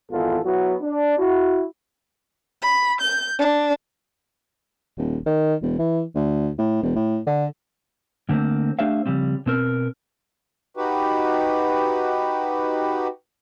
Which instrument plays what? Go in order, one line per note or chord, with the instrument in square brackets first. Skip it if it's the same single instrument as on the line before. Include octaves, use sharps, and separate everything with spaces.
[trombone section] G#1 E3 B3 F4 A4
F#3 B3 E4 F#4
D4
E4 F#4
[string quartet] B5
G6
D4
[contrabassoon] D#1
D#3
E1
E3
D2
A2
E1
A2
D3
[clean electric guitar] D3 A3 A#3 C4
A3 D4 G4 C5 E5 F5
C#3 F3 G3 C4
B2 C4 A#4
[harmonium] D#4 F#4 G4 B4